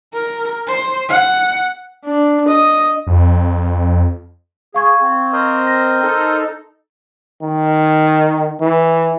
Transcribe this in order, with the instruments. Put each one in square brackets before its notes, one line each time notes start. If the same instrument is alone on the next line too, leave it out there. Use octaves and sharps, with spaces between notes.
[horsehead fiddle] A#4
C5
F#5
[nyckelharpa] D4
D#5
[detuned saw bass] F2
[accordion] G#4 [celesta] F5 C#6 G#6
[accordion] C4
[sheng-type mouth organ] A#4 C5 D#5
[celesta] A#6
[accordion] D#4 A4
[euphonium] D#3
E3